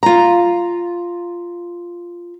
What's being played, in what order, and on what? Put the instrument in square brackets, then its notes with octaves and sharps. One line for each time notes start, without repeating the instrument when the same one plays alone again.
[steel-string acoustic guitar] F4 A#5